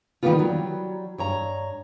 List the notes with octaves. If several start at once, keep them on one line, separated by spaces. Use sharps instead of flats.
D#3 E3 G3 A#3 B3 F4
F#3 G3
G2 C#5 A#5